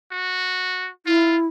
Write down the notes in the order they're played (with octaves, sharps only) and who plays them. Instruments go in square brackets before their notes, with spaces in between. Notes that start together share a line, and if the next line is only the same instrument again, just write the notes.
[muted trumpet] F#4
[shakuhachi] E4 [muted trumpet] F4